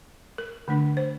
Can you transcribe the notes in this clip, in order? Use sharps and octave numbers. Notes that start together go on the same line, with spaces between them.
A#4
D3 A3 D4
C5